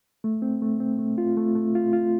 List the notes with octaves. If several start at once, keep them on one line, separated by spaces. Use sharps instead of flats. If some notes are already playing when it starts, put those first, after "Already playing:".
A3
C4
A3
C4
A3
F4
A3
A3
F4
F4